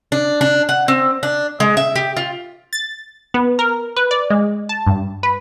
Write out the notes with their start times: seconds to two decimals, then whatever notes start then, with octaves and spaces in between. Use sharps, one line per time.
0.12 D4
0.41 D4
0.69 F#5
0.88 C4
1.23 D4
1.60 G#3
1.77 E5
1.96 G4
2.17 F4
2.73 A6
3.34 B3
3.59 A#4
3.96 B4
4.11 D5
4.30 G#3
4.69 A5
4.87 G2
5.23 B4